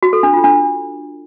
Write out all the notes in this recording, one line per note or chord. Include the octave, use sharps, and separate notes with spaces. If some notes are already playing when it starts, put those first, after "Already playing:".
F#4
A4
D4
F4
D4